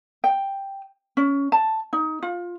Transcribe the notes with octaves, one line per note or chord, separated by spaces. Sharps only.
G5
C#4
A5
D#4
F4